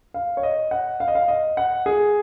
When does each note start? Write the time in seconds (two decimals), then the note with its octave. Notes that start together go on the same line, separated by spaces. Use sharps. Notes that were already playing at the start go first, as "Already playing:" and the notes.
0.14 F5
0.37 C#5
0.43 D#5
0.71 F#5
1.00 F5
1.08 D#5
1.15 F5
1.28 D#5
1.57 F#5
1.86 G#4